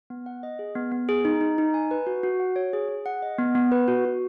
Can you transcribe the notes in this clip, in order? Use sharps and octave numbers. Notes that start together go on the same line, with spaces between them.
B3
F#5
D#5
G#4
B3
B3
G#4
D#4
D#4
D#4
G#5
B4
F#4
F#4
F#5
C#5
G#4
G#4
F#5
D#5
B3
B3
B4
F#4
F#4